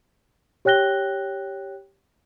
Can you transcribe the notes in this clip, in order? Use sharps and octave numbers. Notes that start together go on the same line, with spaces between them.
G4 C#5 G5 F#6 A#6 G7